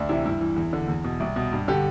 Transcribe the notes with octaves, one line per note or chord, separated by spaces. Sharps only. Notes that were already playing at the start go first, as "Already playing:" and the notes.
Already playing: D2 D4
C3 E3 E4
G2 E4
E3
E2
D3
E2
B2
C2
B2
G2
D3 G4